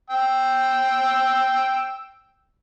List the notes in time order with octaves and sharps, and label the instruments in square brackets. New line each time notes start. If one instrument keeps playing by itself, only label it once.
[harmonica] G5 E6